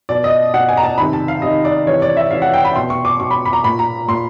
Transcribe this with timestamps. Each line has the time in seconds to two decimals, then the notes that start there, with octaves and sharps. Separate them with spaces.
0.09 B2 D5
0.24 D#5
0.54 B2 F#5
0.69 G#5
0.77 A#5
0.83 A5
0.98 C3 D#3 B5
1.13 A5
1.28 F5
1.42 C3 D#3 D#5
1.65 D5
1.87 C3 E3 C#5
2.02 D5
2.17 E5
2.31 C3 E3 F5
2.42 F#5
2.54 G5
2.65 B5
2.76 B2 C6
2.90 C#6
3.05 D6
3.20 B2 C#6
3.31 B5
3.45 B5
3.53 A#5
3.64 A#2 B5
3.79 A#5
4.08 A#2 C6